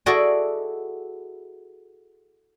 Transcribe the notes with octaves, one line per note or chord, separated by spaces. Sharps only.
E4 F#4 G#4 A4 D5 D#5